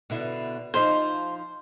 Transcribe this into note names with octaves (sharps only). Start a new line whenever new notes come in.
B2 D3 E4
F3 D#4 C5